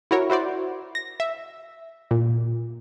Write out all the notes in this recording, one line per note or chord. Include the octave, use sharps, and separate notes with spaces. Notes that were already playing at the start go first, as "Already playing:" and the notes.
E4 F#4 A#4 C#5
E4 F#4 C5 D5
A#6
E5
A#2